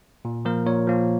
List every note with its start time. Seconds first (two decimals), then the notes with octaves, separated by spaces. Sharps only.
0.25 A#2
0.45 F3 A#3 A#4
0.66 A#2 C#5
0.87 F3 A#3